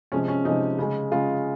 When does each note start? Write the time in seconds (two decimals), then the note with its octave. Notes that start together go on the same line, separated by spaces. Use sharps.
0.12 C3 F3 G#3 C#4
0.28 C#4
0.45 C3 F3 G#3 D#4
0.78 C#3 G#3
1.11 C#3 G#3 F4